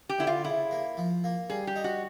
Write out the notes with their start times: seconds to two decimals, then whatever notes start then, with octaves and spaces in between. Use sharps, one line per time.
0.09 G4
0.18 D3 E4
0.27 F4
0.44 C#3 E4
0.71 A#3
0.97 F3
1.24 A#3
1.50 G3 G#4
1.67 G4
1.76 D#4
1.84 F#4